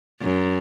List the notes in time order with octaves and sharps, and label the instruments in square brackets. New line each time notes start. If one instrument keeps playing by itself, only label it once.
[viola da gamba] F#2